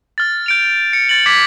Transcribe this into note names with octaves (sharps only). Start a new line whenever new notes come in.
F6 A6
G6 D7 F7
C#7
A6 F#7
D6 G#6 B6